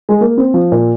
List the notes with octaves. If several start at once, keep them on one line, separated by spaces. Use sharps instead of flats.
G#3
A#3
C4
F3
A#2